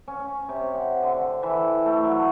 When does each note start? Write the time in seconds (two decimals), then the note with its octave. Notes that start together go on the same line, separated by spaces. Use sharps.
0.08 C#4
0.49 C3
0.75 F#5
1.03 D3
1.43 E3
1.86 A3
2.04 F#3